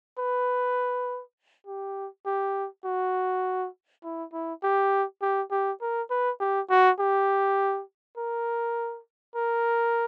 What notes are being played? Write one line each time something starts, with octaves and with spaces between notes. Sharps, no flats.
B4
G4
G4
F#4
E4
E4
G4
G4
G4
A#4
B4
G4
F#4
G4
A#4
A#4